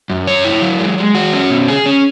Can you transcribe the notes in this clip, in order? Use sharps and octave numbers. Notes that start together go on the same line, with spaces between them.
F#2
C#5
E4
F#3
G#3
G#3
F#4
C#4
B2
G#4
C#4